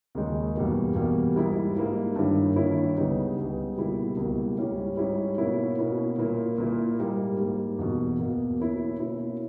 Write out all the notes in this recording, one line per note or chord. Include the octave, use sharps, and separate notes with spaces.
D#2 C#3 G#3 D#4
E2 B2 G3 A#3
E2 B2 G3 A#3
G#2 G3 A#3 E4
G#2 G3 A#3 E4
G2 D#3 A#3 C#4 E4
G2 D#3 A#3 C#4 E4
C#2 C#3 G3 B3 D#4
C#2 C#3 G3 B3 D#4
C#2 B2 G3 A#3 E4
C#2 B2 G3 A#3 E4
G#2 G3 C#4 E4
G#2 G3 C#4 E4
B2 A#3 C#4 E4
B2 A#3 C#4 E4
A#2 A#3 E4
A#2 A#3 E4
G#2 G3 A#3
G#2 G3 A#3
E2 B2 A#3
E2 B2 A#3
B2 A#3 C#4 E4
B2 A#3 C#4 E4